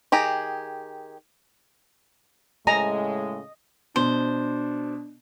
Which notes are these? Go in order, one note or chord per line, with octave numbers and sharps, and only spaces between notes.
D#3 G4 G#4 A#5
A2 C#3 G#3 D#5 G#5 A#5
B2 D4 C5